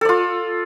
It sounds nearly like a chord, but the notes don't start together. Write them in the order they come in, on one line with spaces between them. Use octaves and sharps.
A4 D5 F4